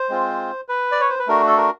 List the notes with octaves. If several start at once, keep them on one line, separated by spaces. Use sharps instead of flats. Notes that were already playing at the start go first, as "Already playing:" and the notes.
Already playing: C5
G#3 C4 F4
B4
D5
C#5
C5
B4
A3 D4 F#4 A#4
A4
A#4